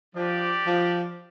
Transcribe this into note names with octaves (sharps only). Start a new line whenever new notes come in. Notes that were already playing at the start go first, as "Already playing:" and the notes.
F3 D4 G4 D5
F3